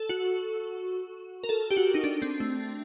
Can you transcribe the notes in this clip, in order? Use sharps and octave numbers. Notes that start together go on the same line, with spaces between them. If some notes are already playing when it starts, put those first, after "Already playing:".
Already playing: A4
F#4
A#4
A4
G4
F#4
D#4
D4
C4
A3